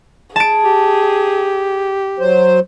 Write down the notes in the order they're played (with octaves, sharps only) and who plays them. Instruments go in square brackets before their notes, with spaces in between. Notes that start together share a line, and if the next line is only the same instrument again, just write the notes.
[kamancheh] G#4 [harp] A5 D7
[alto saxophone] G4
[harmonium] F#3 C5